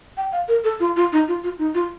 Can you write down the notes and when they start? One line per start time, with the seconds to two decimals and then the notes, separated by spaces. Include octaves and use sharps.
0.17 G5
0.33 F5
0.48 A#4
0.64 A4
0.80 F4
0.96 F4
1.12 D#4
1.28 F4
1.44 F4
1.59 D#4
1.74 F4